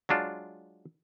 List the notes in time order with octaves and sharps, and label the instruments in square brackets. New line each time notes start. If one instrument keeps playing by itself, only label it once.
[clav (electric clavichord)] F#3 G#3 D4 F4